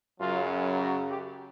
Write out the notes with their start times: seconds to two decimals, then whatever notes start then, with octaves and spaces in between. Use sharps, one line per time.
0.20 F#2 C#3 F#3 F4
0.80 F#4
1.09 G4